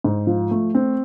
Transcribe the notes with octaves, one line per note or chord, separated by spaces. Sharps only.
G#2
F3
A3
C4